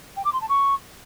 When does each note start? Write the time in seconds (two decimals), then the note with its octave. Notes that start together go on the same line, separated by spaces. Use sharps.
0.16 G5
0.25 D6
0.33 C6
0.41 A5
0.49 C#6